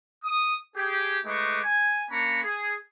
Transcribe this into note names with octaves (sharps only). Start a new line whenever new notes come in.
D#6
G4 G#4
G#3 A3 D#4 B4 C#6 D6
G#5
A#3 C#4 D4 A#5 B5 C#6
G#4